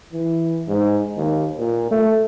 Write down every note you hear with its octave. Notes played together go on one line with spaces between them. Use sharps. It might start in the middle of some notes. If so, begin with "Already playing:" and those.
E3
G#2
D#2
A#2
A3